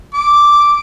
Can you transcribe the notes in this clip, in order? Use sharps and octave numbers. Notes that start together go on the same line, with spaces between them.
D6